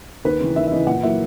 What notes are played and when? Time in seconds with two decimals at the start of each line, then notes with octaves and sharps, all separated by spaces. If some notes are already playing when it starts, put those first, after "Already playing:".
0.25 D#2 B4
0.40 C#3 E3
0.56 D#2 E5
0.67 E5
0.71 C#3 E3 D#5
0.87 A#2 F#5
1.03 F#3 A#3 E4 E5